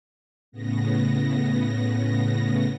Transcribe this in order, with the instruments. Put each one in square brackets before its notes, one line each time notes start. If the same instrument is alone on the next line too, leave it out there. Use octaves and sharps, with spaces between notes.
[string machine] A2 C#3 B3 A#6